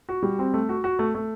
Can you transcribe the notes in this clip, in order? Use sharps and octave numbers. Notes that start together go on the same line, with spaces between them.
F#4
G3
C4
A3
F#4
F#4
A3
A3